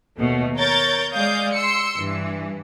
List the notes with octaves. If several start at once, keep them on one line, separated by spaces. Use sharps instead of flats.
D#2 B2 A3
A#4 C#5 G6 A6
G#3 D5 F5 D#6 G6
C6 E6 C#7
G2 E3